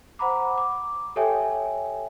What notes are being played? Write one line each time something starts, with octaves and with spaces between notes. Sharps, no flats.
C5 F#5 A#5 B5 D6
D6
G4 A4 C#5 E5 G5 G#5